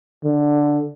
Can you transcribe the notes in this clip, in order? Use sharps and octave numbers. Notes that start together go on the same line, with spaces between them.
D3